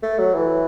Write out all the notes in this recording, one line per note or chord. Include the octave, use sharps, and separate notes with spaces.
A3
F#3
E3